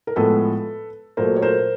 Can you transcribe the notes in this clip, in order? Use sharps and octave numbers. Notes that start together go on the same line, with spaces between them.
A#4
A2 F3 G#3 B3 A4 B4
A#2 F#3 A3 A#4 C5
C#5
A#4 C5